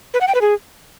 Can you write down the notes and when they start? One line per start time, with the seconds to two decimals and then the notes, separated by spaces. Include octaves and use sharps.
0.14 B4
0.21 F#5
0.28 G5
0.35 B4
0.41 G#4